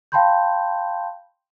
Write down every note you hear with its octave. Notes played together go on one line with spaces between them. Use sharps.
F5 G5 A5 B5 C6 G6